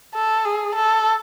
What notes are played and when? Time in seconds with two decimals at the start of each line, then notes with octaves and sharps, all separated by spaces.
0.15 A4
0.45 G#4
0.76 A4